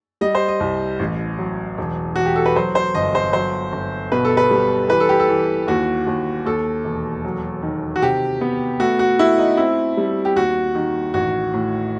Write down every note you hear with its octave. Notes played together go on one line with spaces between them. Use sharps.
G3 D#5
C5
D#5
C2
A1
F#3
E1
E1 F#4
G4
A4
B4
F#3 C5
C5
G1 D#5
C5
F#3 C5
G1
B2 B4
A4
B4
G3
E3 B4
A4
G4
A4
E3
D#2 F#4
D#2
D#2 A4
E1
F#3
D#3
F#4
C3 G4
B3
A3 F#4
F#4
A3 E4
D#4
C4 E4
G3
G4
D#2 F#4
D#3
A1 F#4
A2